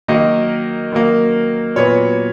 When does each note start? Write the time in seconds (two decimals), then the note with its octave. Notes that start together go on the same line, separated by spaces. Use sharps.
0.08 D#3 F#3 A#3 D#5
0.92 D#3 F#3 A#3
1.76 A#2 F#3 B3 C#5